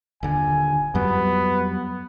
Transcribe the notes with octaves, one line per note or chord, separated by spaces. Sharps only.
D#1 D3 G#5
F2 F#3 G3 B3